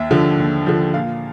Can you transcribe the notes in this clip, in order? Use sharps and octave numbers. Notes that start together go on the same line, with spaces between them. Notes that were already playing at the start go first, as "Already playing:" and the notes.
Already playing: D#2 E5
D3 F3
D#2
D3 F3
A#2 F5